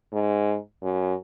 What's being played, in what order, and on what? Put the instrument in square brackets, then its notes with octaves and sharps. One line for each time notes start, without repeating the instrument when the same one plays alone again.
[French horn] G#2
F#2